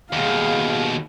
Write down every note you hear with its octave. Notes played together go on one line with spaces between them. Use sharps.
D#2 B2 G#4 F5